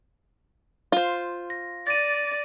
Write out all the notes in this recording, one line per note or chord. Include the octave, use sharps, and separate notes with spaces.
F4 C5
A#6
D5 A6 A#6 D#7